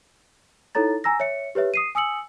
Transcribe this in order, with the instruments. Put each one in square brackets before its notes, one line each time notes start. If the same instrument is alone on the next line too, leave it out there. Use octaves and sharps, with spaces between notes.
[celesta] D#4 E4 A4 C#5 A#5 A6
G#5 A#5 E6 A#6
C#5 E5 C#7
G4 B4 C#5 E5
D#6 C7 D#7
G#5 D#6 E6 C#7 F#7